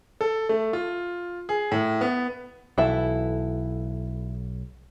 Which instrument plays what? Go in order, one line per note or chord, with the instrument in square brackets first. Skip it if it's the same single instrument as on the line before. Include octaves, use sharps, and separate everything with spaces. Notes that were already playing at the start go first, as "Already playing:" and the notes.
[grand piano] A4
A3
F4
G#4
A2
B3
[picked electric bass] B1 [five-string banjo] E3 E4 A4